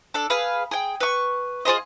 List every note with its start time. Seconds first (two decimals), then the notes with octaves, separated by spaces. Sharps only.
0.14 D4 A4
0.30 G#4 B4 F5
0.71 G#4 G5
1.00 B4 C#6
1.65 F4 G#4 C5 D#5